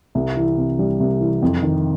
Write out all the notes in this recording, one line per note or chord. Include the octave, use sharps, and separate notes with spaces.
C2
E3
C3
G3
C2
E3
F2
D#3